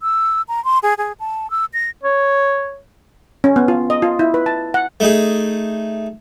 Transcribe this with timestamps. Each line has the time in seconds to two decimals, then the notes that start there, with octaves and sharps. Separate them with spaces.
0.01 E6
0.48 A#5
0.65 C6
0.83 G#4
0.98 G#4
1.20 A5
1.51 E6
1.73 A#6
2.03 C#5
3.44 C#4
3.56 B3
3.68 F4
3.90 D#5
4.02 F4
4.19 E4
4.34 B4
4.46 A5
4.74 F#5
5.00 A3 D#4 G#4